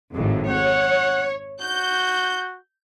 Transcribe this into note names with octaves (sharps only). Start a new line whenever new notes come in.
G#1 F2 A2
C#5 F#5
F#4 G6